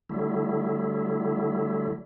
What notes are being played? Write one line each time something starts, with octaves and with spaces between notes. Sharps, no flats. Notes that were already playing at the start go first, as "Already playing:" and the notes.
D3 F#3 G3 A3 E4